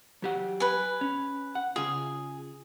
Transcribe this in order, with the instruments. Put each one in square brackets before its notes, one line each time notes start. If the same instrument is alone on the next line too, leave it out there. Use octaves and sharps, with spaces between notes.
[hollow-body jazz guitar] F#3 G4 F#5
[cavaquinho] B4 G#5
[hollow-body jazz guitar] C#4
F#5
[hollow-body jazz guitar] C#3 F4 [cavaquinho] G#4